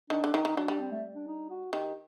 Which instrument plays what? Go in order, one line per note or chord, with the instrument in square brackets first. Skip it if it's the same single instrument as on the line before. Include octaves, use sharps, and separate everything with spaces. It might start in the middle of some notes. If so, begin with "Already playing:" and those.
[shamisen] D#3 [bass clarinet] D4
[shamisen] D3
[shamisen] D#3 [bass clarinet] D#4
[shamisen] D#3
[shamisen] F#3 [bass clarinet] D4
[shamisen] G3
[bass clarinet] C4
A3
D4
D#4
F#4
[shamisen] D#3 [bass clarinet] G4